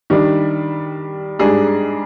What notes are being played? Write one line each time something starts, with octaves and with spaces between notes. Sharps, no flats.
D#3 G3 D4
G#2 G3 D4 G#4